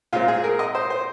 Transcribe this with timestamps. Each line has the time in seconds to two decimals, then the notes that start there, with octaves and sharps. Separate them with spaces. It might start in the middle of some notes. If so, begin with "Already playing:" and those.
0.13 A#2 G#3 C4 F4
0.28 G#4
0.44 A#4
0.59 D#5
0.75 C5
0.90 C5